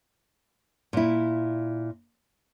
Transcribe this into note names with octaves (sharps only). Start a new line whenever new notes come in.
A#2 E4